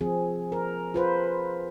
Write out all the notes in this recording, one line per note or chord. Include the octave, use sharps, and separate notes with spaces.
F3 C4 G#4
A#4
F4 B4 C5